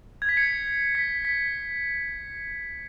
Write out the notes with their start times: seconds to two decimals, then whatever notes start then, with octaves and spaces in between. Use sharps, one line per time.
0.22 G#6
0.29 B6
0.37 G#6 C#7
0.95 B6
1.25 B6